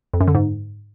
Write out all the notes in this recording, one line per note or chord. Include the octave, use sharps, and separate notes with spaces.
F2
F#2
D3
G#2